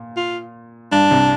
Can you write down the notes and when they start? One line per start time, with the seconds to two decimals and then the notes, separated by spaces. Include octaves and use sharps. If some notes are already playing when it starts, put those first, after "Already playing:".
Already playing: A#2
0.16 F4
0.92 G2 D4
1.11 C2 C3